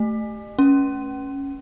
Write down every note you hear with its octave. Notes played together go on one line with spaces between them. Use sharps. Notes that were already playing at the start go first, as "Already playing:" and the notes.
Already playing: A3
C#4